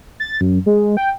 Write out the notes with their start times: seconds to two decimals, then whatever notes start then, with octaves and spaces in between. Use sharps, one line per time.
0.20 A6
0.41 F#2
0.66 G#3
0.97 G5